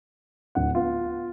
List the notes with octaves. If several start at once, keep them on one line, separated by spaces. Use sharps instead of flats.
D1 F#5
B3 F4